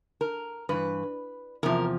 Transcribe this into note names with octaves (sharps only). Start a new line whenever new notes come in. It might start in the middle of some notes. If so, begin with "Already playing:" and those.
A#4
G2 E3 B4
E2 C3 F3 A#4